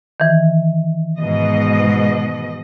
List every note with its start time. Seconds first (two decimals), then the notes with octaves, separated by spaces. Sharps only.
0.20 D#3 E3
1.19 G#2 B2 D#5